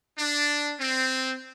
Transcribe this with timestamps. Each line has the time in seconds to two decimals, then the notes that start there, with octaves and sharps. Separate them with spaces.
0.18 D4
0.79 C4